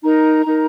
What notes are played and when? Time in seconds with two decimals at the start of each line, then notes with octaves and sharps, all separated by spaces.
0.03 D#4 A#4 A#5
0.45 D#4 A#4